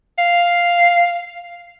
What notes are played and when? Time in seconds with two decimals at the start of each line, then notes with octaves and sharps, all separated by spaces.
0.18 F5